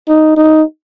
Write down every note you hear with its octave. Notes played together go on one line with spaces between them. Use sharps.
D#4
D#4